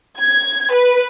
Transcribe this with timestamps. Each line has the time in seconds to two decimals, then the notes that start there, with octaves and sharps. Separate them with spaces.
0.19 G#6
0.73 B4